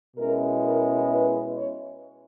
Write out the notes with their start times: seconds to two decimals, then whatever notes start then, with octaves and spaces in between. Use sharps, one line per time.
0.17 B2 G#3 C#4 E4 A#4
0.62 A#4
1.08 B4
1.54 C#5